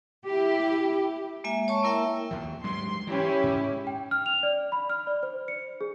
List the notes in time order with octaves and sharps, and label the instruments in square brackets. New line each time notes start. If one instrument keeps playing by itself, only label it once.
[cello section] E4 G4
[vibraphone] G#3 A#3 E5 G#5
C#5 A5 C#6
A#3 E4 A#4 E5 G5 E6
[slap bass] D#2 F3
[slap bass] G#2 F#3 G3 [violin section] C6
[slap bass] E3 [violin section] C#4 E4 G4
[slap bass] G#2
[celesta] G5
F6
F7
D5
B5
F6
D5
C5
C#7
G#4